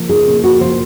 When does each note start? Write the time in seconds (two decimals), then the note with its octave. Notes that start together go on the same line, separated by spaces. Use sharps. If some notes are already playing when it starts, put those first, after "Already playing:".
Already playing: F3 A#3
0.09 D#4 G#4
0.27 A#2
0.44 A#3 F#4
0.61 F3 C5